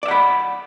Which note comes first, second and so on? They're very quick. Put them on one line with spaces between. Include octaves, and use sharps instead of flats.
D5 E5 F#5 B5